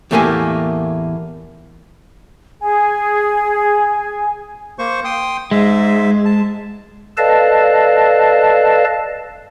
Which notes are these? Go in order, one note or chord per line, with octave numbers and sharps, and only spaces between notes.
E2 A2 A3 A#3 G4 G#5
G#4 G#5
A#3 C5 C#6
G5 C6 D#6
G#2 G#3 E5
A5
A4 B4 D5 D#5 F5 A5